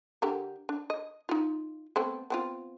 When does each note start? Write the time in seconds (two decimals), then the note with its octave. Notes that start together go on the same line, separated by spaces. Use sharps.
0.22 D3 G4 A#4
0.69 D4
0.90 D#5
1.29 D#4 F4
1.96 A3 B3 C4
2.30 B3 C4 F4